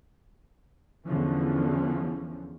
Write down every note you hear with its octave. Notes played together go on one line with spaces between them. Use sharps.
E2 D3 E3 F3 C#4